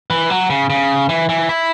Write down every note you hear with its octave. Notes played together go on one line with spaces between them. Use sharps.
E3
F#3
C#3
C#3
E3
E3
E4